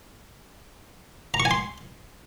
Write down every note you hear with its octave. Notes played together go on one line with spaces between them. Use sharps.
A#5
C#6
G#5
C6